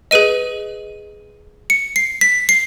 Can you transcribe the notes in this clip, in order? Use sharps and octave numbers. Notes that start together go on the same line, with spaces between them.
G#4 B4 D#5 D#7
C#7
C7
B6
C7